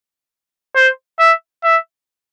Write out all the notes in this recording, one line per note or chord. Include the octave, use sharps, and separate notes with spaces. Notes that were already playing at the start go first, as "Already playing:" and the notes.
C5
E5
E5